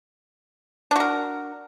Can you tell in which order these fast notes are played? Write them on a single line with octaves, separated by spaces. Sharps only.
D4 F#4 A#4